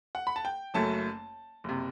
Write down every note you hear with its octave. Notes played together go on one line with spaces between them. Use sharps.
F#5
B5
A5
G5
F#1 F#2 F#3 A3 A5
F#1 C3